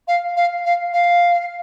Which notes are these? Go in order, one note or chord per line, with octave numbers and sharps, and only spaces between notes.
F5
F5
F5
F5